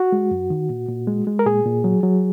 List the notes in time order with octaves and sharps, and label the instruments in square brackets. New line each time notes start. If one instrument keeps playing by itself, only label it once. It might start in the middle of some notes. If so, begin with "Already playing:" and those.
Already playing: [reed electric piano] F#4
G#3
F#2
D#3
A#2
A#2
G#3
G#3
A#4
A#2 G#4
A#2
F#3
F#3